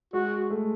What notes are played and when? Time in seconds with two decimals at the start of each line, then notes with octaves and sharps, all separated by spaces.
0.13 G#3 F#4
0.50 A3